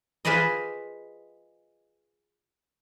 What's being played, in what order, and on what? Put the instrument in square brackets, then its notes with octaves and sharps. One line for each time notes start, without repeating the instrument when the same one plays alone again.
[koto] F4 G#4 B4 C5 D5 D#5